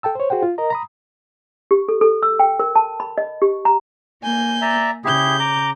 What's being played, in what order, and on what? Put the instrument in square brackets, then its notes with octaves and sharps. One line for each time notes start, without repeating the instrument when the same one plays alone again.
[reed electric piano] A4 G5 A5 E6
C5 C#5
F#4 G#4 C5 F#5 G5
F4
A#4 D#5 A#5
A#5 B5 D#6
[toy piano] G4
A4
A4
E6
G5
A#4
A5
B5
D#5
G4
A#5
[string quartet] A#3 G#5 G6
[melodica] D5 E5 A#5
[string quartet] C#3 G6 [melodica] E4 G4 G#4
[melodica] A#5 D6